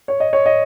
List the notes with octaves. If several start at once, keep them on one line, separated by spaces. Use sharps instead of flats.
C#5
D#5
C#5
D#5